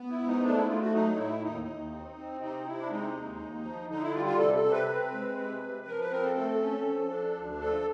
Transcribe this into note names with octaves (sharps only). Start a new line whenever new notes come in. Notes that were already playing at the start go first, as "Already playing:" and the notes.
Already playing: B3
E4
G#2
D#4
A3 D4
E4
A3 F4
F#4
F#3 D#4
A2 E4
D#2 D#4
D#2
C4
C4
C3 D#4
C3 E4
D4
G#3 D#4
D#2
D#2
F3
D3 D#4
E4
G3 F4
F4
C3 A4
A4
C3
B4
C4
G#3
C3
C3
F3 A#4
B4
C4 A#4
A4
A3 A4
C#4
F3
D4
D2
F3 A4